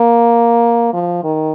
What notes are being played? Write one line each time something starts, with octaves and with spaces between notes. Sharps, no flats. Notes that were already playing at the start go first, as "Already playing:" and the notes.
Already playing: A#3
F3
D#3